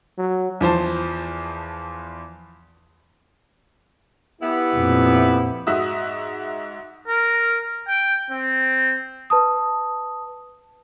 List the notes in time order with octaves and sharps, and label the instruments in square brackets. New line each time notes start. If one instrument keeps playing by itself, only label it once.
[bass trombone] F#3
[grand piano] E2 F3 C5 A5
[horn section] B3 E4 G4
[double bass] F2 A#2
[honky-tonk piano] G#2 F#4 E5 D#6
[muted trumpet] A#4
G5
C4
[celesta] B4 A5 D#6